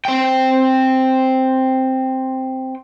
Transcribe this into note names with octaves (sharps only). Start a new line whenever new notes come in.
C4 G5